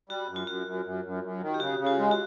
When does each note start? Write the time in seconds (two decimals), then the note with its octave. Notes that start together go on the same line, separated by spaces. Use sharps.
0.09 G3 F#4
0.29 F#2
0.36 F4
0.47 F#2 F#4
0.67 F#2
0.85 F#2
1.05 F#2
1.24 F#2
1.42 D#3
1.54 G4
1.60 C#3 F#4
1.79 C#3
1.86 F4
1.99 G#3
2.11 F#4